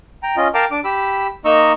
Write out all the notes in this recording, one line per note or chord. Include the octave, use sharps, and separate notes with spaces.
G5 A#5
C#4 F4 D#5
A#4 F5 G5 A5 A#5 D6
D4 D6
G4 B5 E6
A#3 D#4 D#5 A#5 C#6 E6